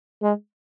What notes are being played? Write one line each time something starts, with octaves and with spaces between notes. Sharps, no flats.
G#3